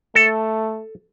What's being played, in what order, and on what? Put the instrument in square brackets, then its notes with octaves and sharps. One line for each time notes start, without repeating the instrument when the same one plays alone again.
[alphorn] A3 [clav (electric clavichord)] A4